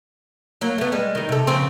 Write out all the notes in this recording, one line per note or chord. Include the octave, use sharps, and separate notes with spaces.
F#3 A#3
A3 B3
G3 G#3
D#3 D#4
C3 A4
C#3 F3 C4